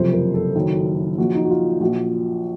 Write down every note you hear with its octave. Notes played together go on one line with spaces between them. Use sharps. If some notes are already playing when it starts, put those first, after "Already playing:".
Already playing: F#1 F2 C3 F3 C5
A#4
A4
F#1 F#2 D#3 F#3
A#1 A#2 F#3 F#4
D#4
F#4
F4
A#1 A#2 F3 F#4